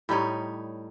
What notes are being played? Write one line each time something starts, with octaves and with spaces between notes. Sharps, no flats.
A2 G3 D#4 C#5